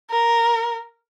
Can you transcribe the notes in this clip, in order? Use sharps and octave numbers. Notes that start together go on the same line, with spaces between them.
A#4